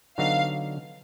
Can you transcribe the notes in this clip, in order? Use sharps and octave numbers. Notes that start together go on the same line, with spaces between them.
D3 F#3 B3 D#4 F#4 F5